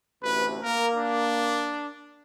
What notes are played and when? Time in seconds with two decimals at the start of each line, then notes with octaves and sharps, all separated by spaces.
0.22 A1 D2 C3 B4
0.62 A#3 A#4
0.95 D4